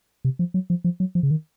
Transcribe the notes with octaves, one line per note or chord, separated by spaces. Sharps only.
C3
F3
F#3
F3
F3
F#3
F3
C#3
D#3